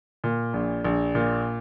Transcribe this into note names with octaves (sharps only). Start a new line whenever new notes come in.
A#2
A#1
A#1
A#2